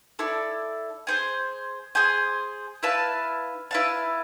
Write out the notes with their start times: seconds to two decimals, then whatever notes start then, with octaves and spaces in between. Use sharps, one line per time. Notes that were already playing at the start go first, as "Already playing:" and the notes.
0.19 E4 A4 D5
1.07 G#4 C5 G#5
1.95 G#4 C5 G#5
2.83 E4 B4 F5 A5
3.71 E4 B4 F5 A5